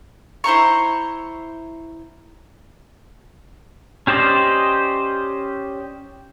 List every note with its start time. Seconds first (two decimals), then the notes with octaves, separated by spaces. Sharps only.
0.44 E4 C5 A#5 C#6
4.07 C#4 G4 C5 D5 D#5